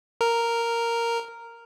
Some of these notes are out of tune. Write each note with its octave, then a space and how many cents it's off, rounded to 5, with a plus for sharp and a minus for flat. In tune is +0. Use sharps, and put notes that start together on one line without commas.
A#4 -5